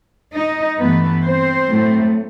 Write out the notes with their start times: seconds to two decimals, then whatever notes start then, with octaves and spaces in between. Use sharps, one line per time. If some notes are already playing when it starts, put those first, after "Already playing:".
0.33 D#4 D#5
0.78 G2 E3 A3 B3 B4
1.24 C4 C5
1.69 A2 F#3 A3